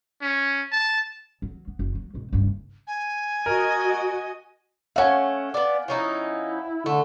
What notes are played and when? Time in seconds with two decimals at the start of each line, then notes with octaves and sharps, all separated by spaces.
0.22 C#4
0.72 A5
1.42 F#3
1.67 B3
1.79 F#1
1.95 F#3
2.14 G#1 B2
2.32 F#1 G2
2.87 G#5
3.46 F#4 A#4 D#5
4.96 A3 C#4 F5 F#5 G#5
5.54 B3 D5
5.88 F3 C#4 D#4 E4
6.86 D3 A3